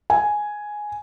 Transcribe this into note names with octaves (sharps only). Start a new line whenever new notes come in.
G#5